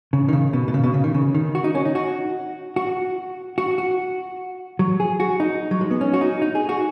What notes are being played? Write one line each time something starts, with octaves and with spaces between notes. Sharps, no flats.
C#3
D#3
C#3
B2
B2
C#3
B2
C#3
D#3
C#3
D#3
F#4
D#4
C#4
D#4
F#4
F#4
F#4
F#4
F#3
G#4
F#4
D#4
F#3
G#3
B3
C#4
F#4
D#4
D#4
G#4
F#4